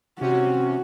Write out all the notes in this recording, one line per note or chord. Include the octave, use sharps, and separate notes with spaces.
C3 C#4 F#4